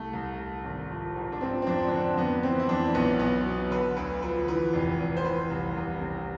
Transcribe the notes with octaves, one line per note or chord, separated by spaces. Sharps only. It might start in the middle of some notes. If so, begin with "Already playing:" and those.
Already playing: C2 A3
C2
C2
G#1
F3
G#2
D4
F3 C4
C4
F2 D4
D4
D3 C4
F2 B3
E3 C4
E4
F2 D4
B1 B3
B1 B3
B2
D3 B4
D2 B4
F3 B4
E3 B4
F1
F1
C5
E3 B4
C2
C2
C3